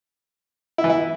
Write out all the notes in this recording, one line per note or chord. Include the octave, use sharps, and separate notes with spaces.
E4
E3
E4